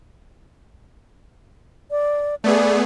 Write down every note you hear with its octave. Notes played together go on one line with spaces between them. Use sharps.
D5
A3 B3 G#4 D5